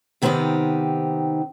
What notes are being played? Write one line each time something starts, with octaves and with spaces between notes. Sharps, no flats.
C3 D#3 B3 C4 D#4 G4